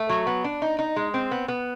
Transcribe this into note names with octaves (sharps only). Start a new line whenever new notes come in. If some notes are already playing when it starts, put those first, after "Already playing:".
Already playing: A3
F#3
B3
D4
D#4
D#4
G#3
C4
B3
B3